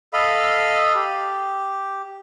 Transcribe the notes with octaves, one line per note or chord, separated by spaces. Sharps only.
A4 D#5 F5 B5
G4